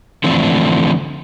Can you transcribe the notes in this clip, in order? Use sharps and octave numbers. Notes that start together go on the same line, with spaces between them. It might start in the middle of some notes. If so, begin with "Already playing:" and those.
D3 E3 F3 A3 C4 D4